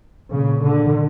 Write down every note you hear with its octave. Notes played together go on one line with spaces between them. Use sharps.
A#2 C#3
D3